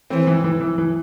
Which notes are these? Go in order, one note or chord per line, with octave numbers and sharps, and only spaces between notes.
E3 C4
E3
E3
E3
E3